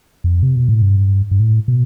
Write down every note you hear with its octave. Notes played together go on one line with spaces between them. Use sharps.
F2
C3
B2
A2
G2
G2
A2
B2